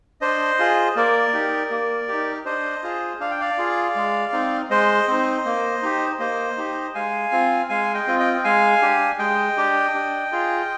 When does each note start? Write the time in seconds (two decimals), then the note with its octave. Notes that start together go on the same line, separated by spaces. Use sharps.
0.21 D4 C5 D#5
0.59 F4 G#4
0.96 A#3 A#4 D5
1.33 D#4 G4
1.70 A#3
2.08 D#4 G4
2.45 D4 C5 D#5
2.83 F4 G#4
3.20 D4 F5
3.31 G5
3.41 D5 F5
3.58 F4 G#4
3.96 G#3
4.32 C4 D#4
4.70 G#3 C5 D#5
5.08 C4 D#4
5.45 A#3
5.82 D#4 G4
6.19 A#3 C5 D#5
6.57 D#4 G4
6.95 G#3 F5 G#5
7.32 C4 F4
7.69 G#3 F5 G#5
7.94 D#5 G5
8.07 C4 F4
8.19 D#5 G5
8.34 G5
8.44 G#3 F5 G#5
8.82 D4 G4
9.19 G#3 D#5 G5
9.57 D4 G4
9.94 D4
10.32 F4 G#4